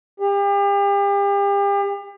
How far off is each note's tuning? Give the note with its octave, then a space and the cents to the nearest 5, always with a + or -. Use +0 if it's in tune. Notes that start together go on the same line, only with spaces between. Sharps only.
G4 +40